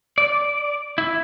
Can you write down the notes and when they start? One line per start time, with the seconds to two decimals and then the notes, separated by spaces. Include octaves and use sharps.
0.18 D5
0.98 E4